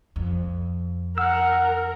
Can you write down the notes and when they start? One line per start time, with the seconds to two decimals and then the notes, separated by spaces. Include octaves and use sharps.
0.16 F2
1.18 A#4 F#5 E6 F6